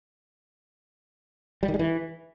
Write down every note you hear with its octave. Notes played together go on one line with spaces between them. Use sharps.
G3
D#3
G#3
E3